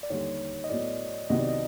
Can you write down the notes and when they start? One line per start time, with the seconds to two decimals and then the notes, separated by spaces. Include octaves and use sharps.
0.03 D5
0.10 D#2 D3 G3 C#5
0.64 D#5
0.69 A2 F#3 B3 D5
1.29 C2 C3 D#3 F#3 B3 D#5
1.39 D5
1.49 D#5